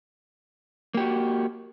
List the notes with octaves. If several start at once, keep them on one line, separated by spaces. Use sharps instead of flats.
A#3 F#4 G4